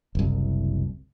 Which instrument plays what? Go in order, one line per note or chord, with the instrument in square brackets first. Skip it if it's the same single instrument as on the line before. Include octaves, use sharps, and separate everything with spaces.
[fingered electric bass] F#1 C2